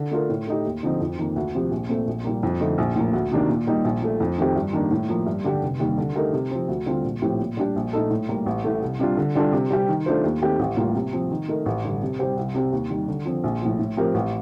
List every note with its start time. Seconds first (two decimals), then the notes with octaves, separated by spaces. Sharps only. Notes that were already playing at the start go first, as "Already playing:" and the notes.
Already playing: D3
0.11 A3 D4 F4 A#4
0.30 A2
0.47 A3 D#4 G4
0.65 D#2
0.83 D3 F3 C4 D#4
1.01 F2
1.18 D#3 A#3
1.36 D2
1.54 C3 F3 C4 G4
1.71 A#1
1.89 A#2 A3 C4
2.07 A#1
2.25 A#2 G3 A#3
2.43 F2
2.61 D3 F3 A3 D#4
2.78 A#1
2.96 A2 F3 A#3
3.13 D2
3.31 C3 D#3 A#3 D4
3.49 A#2
3.67 G3 A#3 D#4
3.85 A#1
4.02 A#2 A3
4.20 F2
4.38 D#3 A3 C4 G4
4.56 G2
4.73 D#3 A#3 D4
4.91 A2
5.09 F3 A#3
5.26 G2
5.44 D3 G3 D4 G4
5.62 F1
5.80 D#2 D#3 G3
5.98 D3
6.16 A3 D#4 G4 A#4
6.33 C3
6.51 F3 C4
6.68 D2
6.86 D3 G3 C4 F4
7.05 A#1
7.22 A2 F3 C4 G4
7.40 A#2
7.57 G3 D4 G4
7.76 A#1
7.93 A#2 A3 D#4 A4
8.11 A2
8.29 G3 A#3
8.46 A1
8.64 A2 A3
8.82 C2
8.99 C3 G3 D4 F4
9.17 D3
9.35 G3 D4 F4 A4
9.52 C3
9.71 G3 C4 G4
9.89 D#3
10.06 A3 D4 F4 C5
10.24 D#2
10.42 D#3 A3 C4 G4
10.59 A1
10.77 A2 G3 A#3 F4
10.95 C3
11.13 F3 C4
11.31 D#3
11.48 A3 D#4 A#4
11.66 A1
11.83 G2 D3
12.02 C3
12.19 G3 C4 G4 C5
12.37 C2
12.54 C3 G3 C4 G4
12.72 D#2
12.90 D#3 G3
13.08 D3
13.25 F3 C4
13.44 A#1
13.62 A2 F3
13.79 A2
13.97 F3 C4 G4 A#4
14.14 A1